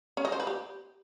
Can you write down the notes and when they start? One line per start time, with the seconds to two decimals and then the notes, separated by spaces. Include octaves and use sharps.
0.17 C#4
0.25 D#5
0.32 C5
0.40 B4
0.47 G4